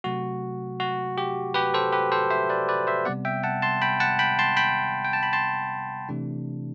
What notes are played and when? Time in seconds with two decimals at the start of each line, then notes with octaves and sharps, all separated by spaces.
0.04 C3 F#3 A3 F#4
0.80 F#4
1.18 G4
1.54 G4 B4
1.74 A4 C5
1.93 G4 B4
2.12 A4 C5
2.30 C5 E5
2.49 B4 D5
2.69 B4 D5
2.87 C5 E5
3.05 C3 G3 B3 D5 F#5
3.25 E5 G5
3.44 F#5 A5
3.62 A5 C6
3.82 G5 B5
4.00 F#5 A5
4.19 G5 B5
4.39 A5 C6
4.57 G5 B5
5.05 G5
5.13 A5
5.23 B5
5.33 A5 C6
6.09 C3 E3 A3 D4